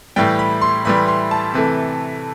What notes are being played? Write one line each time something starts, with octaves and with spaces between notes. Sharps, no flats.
A2 E3 G3 G5
B5
C6
A2 E3 G3 B5
C6
A5
C3 E3 A3